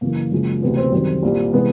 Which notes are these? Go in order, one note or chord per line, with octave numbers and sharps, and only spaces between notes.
F#2 C#3 E3 A#3
F#2 C#3 F3 G#3
D2 C3 E3 B3
C4
F#2 D#3 G3 C4
C2 A#2 G3
C3 E3 G#3 B3